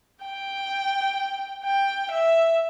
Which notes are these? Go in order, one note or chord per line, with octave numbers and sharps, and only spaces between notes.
G5
G5
E5